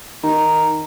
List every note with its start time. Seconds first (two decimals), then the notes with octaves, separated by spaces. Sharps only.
0.24 D#3 A#5